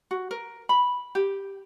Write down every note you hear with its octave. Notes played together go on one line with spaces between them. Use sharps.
F#4
A#4
B5
G4